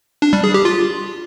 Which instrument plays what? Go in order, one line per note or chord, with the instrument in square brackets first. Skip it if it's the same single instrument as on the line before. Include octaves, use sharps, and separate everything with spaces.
[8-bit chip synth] D4
G3
G#4
G4
F4